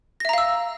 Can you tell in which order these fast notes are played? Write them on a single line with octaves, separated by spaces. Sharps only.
A#6 E5 A#5 F5 E6